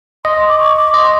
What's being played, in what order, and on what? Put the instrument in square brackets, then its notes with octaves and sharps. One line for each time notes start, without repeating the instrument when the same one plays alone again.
[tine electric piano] D#5 [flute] C6
[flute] D6
C#6
D6
[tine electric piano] D#5 [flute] C6